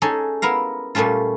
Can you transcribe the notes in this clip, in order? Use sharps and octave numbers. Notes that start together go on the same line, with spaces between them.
C#4 D#4 G#4 A4
B3 E4 A#4 F5
A#2 G3 A3 C#4 F4